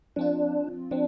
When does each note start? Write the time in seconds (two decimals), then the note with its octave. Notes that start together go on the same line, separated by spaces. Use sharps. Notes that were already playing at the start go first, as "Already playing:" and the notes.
0.16 F3 C4 D4 F4
0.91 F3 C4 D4